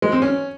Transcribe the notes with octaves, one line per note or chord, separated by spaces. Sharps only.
G#3
C4
C#4